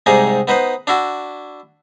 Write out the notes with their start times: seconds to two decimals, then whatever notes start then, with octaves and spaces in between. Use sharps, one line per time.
0.06 G#2 C3 G3 D#4 G#4
0.47 B3 D#4 B4 C5
0.87 D4 E4 F#4